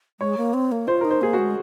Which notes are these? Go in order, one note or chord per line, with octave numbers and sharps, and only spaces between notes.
G#3 C#5
A#3
C4
A#3
F4 C5
D#4 A#4
C5
A#3 G#4
F#4
G#3